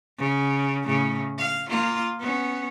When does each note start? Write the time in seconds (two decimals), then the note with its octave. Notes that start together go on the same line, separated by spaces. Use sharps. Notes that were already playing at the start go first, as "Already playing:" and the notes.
0.18 C#3
0.84 A2 C#3
1.38 F5
1.68 A#3 F4
2.20 B3 C#4